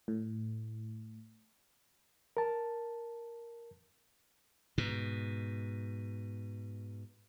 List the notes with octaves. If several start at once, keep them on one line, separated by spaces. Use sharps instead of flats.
A2
A#4 A5
G#2 B2